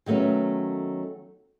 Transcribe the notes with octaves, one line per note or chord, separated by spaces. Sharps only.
D#3 F#3 A3 B3 C#4